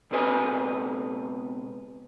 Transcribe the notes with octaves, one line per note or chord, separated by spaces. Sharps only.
C#2 B2 C4 B4 D#5 G#5